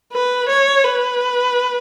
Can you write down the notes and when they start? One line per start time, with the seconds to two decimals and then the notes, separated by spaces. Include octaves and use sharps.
0.13 B4
0.49 C#5
0.84 B4